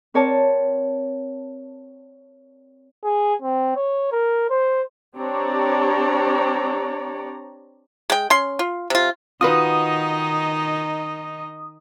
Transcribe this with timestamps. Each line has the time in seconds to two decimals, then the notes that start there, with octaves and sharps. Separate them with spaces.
0.14 C4 A#4 C#5 D5 A5
3.04 G#4
3.42 C4
3.76 C#5
4.12 A#4
4.50 C5
5.17 C4 D4 G4 C#5 D5 A#5
8.10 G#3 G5
8.30 C#4 C6
8.59 F4
8.90 C3 F4
9.41 D#3 D#4 F4 F#4 B4 D#5 D#6